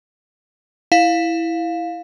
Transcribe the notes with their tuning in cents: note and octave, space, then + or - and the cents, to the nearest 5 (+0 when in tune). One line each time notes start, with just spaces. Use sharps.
E4 +0 F5 +10